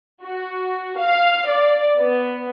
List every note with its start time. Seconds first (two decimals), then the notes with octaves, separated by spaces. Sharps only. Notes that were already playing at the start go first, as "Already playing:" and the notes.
0.21 F#4
0.97 F5
1.47 D5
1.98 B3